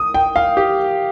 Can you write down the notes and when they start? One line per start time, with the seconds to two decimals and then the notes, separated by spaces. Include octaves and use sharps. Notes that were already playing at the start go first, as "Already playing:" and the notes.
Already playing: D#6
0.14 G5
0.36 F5
0.57 G4